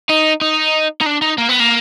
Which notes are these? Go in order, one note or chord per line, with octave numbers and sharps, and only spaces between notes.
D#4
D#4
D#4
D4
D#4
A#3
B3
A#3